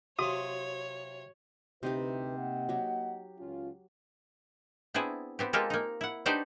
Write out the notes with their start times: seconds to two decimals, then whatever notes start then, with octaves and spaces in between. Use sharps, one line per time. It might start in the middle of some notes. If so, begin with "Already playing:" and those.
0.19 C3 F#3 F4 F#4 C#5 D#6
1.83 D2 C3 D#4 E4 G4 B4
2.37 A#3 D#5 F#5
2.69 F#3 G4
3.39 C#2 C#4 F4
4.94 B3 C4 D4 E4 G#4
5.39 B3 C4 G4
5.53 G#3 A#3 F4 G4 A4
5.70 A#3 D#4
6.01 E4 F#5
6.26 D4 D#4 F#4 G4 B4 C5